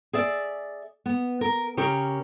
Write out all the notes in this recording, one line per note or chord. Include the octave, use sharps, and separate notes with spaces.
G#4 D5 E5
B3
A#4
C#3 C#4 G4 A#4